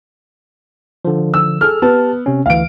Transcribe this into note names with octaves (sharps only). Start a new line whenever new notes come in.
D3 F3
E6
G#4 A4 F6
B3 G4 A5
C3 C#4
D2 E3 F5 D7